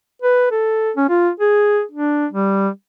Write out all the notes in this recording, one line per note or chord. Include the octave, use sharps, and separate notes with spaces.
B4
A4
C#4
F4
G#4
D4
G3